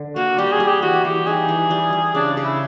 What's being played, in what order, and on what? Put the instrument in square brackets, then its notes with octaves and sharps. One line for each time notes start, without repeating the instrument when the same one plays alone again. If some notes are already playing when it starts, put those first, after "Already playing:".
Already playing: [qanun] D3
[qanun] A#3 [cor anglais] F#4
[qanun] G3 [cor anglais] G4
[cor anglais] G#4
[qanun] G3
[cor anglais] G4
[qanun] E3 [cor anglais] F#4
[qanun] E3 [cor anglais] G4
[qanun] D#4 [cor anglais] G#4
[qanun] E3
G3
G3
[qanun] C#3 [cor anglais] D4
[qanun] C#3
[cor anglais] E4